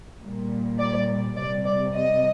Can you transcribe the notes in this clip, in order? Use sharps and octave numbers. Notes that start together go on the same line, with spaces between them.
A#2 G3
D5
C3 G3 D5
D5
D#5